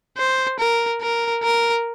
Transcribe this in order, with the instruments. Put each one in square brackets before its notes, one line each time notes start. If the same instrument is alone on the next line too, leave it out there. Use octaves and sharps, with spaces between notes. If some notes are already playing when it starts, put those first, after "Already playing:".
[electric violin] C5
A#4
A#4
A#4